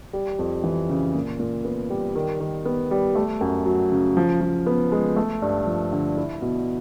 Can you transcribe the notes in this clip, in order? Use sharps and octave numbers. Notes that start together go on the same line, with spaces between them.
G3
F2
E3
C#3
A#2
A#2
B3
G3
D#3
D#3
B3
G3
A3
F#2
F#3
C#3
F3
F3
B3
G#3
A3
G2
F3
D3
E4
B2